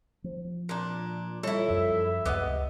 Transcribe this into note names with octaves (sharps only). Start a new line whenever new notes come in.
F3
A#2 D4
G3 E4 F4 A4 C#5
F#2 F3 E5
C#2 C3 B3 D#5 F#5 D6